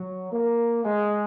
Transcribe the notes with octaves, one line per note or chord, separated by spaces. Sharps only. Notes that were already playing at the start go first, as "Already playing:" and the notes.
Already playing: F#3
A#3
G#3